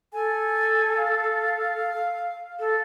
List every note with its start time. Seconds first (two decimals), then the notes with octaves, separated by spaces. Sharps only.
0.13 A4 G#5
0.97 F5
2.59 A4